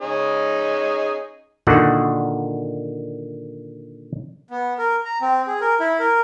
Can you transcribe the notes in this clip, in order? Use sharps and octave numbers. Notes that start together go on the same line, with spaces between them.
C#4 D#4 G#4
A#2 D3 D#3 F#4 F#5
B3
A#4
A#5
C4
G#4
A#4
E4
A#4